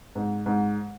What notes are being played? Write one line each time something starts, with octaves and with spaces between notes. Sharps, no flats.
G#2
G#2